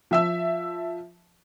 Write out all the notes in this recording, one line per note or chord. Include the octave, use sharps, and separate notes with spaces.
F3 E5 E6